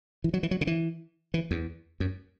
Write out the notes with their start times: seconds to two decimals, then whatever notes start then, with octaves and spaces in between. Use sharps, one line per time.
0.24 E3
0.34 F#3
0.43 E3
0.51 F#3
0.61 C#3
0.67 E3
1.34 E3
1.51 E2
2.00 F#2